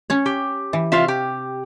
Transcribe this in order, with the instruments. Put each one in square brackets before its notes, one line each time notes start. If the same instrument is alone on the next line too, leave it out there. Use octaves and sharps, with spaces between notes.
[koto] C#4 C#5
[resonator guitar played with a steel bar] G4
[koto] E3
[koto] C3 F5 [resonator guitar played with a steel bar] F4 E5
[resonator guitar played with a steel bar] G4